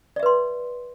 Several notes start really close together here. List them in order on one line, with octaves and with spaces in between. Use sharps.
D5 E5 B4 C6